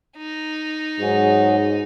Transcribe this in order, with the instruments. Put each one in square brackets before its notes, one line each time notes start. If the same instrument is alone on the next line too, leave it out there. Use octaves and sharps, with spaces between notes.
[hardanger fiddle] D#4
[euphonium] G#2 [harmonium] F#3 F#4 G#4